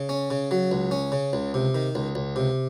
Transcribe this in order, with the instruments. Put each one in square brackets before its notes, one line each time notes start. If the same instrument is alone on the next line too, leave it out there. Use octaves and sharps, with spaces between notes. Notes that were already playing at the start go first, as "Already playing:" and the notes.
Already playing: [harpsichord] C#3
C#4
C#3
F#3
C#2
C#4
C#3
C#2
C3
D#3
C#2
C#2
C3